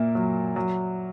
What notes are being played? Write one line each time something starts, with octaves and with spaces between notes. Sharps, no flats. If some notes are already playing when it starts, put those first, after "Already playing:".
Already playing: A#2 A#3 E5
F#3
F#3